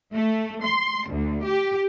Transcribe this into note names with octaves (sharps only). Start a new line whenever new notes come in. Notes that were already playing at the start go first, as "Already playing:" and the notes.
A3
C6
D2
G4